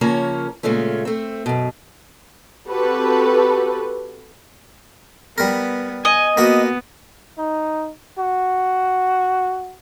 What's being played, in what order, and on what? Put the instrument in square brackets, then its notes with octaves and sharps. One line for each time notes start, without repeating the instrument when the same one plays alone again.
[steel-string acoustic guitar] C#3 F3 A#3 C#4 A#4 C#5
A#2 C#3 G#3 A3 C#4
A3 C4
F#2 B2
[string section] C4 F#4 G4 A4 B4
[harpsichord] G3 A#4 [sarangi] B3
[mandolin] D#5 [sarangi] G#5
[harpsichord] A#3 F#4 [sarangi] B3
[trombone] D#4
F#4